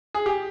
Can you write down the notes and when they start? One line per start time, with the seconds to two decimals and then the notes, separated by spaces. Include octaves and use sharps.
0.14 G#4
0.26 G4